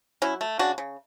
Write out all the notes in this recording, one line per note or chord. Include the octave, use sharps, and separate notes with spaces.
F#3 C#4 E4
A3
C#3 D4 F#4
C#3